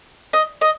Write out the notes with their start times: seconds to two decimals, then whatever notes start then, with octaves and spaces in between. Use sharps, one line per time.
0.33 D#5
0.61 D#5